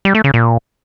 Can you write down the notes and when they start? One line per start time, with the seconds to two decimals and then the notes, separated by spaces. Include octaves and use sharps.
0.05 G3
0.15 A3
0.24 C#3
0.34 A#2